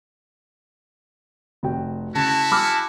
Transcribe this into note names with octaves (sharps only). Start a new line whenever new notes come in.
F1 F#4 G5
C#3 E4 F#4 A5
G#5 B5 D6 E6 F6